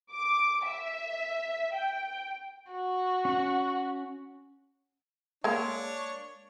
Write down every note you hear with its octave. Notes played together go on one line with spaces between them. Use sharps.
D6
E5
G5
F#4
C#4 F#5
G#3 A#3 D4 C#5